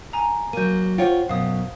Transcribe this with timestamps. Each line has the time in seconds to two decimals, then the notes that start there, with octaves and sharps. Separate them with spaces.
0.13 G#5 A#5
0.53 F#3 A#3 G6 D#7
0.98 F4 C5 C#5 F#5 G5
1.29 F#2 B2 F5 D#6